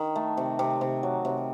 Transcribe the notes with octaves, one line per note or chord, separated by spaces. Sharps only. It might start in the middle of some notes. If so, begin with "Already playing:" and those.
Already playing: D#3
A3
C3
C3
C3
F#3
C3